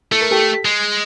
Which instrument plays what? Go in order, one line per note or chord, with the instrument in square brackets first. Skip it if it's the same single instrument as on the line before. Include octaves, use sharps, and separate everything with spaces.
[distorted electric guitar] A3 [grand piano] A4
[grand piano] A#4
G4 A4
[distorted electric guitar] G#3